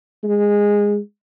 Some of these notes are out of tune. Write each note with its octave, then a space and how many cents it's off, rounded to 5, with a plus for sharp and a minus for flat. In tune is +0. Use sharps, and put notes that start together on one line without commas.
G#3 -15